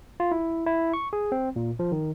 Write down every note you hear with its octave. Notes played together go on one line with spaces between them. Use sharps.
F4
E4
E4
C#6
G#4
C4
A#2
F3
D#3